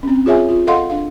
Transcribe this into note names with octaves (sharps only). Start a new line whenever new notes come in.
C4 C#4
F4 G#4 C#5 E5 G#5
F4
A4 D#5 F5 F#5 C6
D4 F5